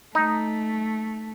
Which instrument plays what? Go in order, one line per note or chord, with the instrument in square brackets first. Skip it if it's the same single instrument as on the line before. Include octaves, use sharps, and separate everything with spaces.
[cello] A3 [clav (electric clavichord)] D#4